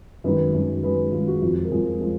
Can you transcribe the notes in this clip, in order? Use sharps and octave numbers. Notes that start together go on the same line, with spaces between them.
F#2 D#3 G#3 B4
F#2 D#3 G#3
F#2 D#3 G#3 B4
F#2 D#3 G#3 F4
F#4
F2 F3 G#3
A#4
F2 F3 G#3 G#4
F3 G#3